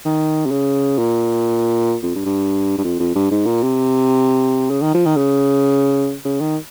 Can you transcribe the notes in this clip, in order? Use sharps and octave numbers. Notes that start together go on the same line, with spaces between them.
D#3
C3
C#3
A#2
F2
G2
G2
G2
F2
F2
G2
G#2
A#2
C3
C#3
D#3
F3
D#3
C#3
C#3
D#3